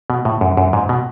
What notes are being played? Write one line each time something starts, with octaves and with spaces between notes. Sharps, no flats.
B2
A2
F#2
F#2
G#2
B2